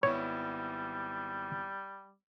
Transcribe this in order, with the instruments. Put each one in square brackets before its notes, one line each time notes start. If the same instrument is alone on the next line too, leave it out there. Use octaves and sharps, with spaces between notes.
[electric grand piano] G#1 B3 E4 [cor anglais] G3 [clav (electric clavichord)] C#5